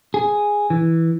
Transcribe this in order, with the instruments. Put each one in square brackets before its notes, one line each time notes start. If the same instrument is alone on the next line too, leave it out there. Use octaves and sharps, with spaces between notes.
[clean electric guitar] G#4
E3